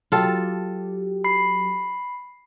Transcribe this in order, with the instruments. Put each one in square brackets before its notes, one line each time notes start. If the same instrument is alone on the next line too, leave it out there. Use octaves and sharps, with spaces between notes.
[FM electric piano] F#3 G4 [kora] F4 A4
[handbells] B5 C7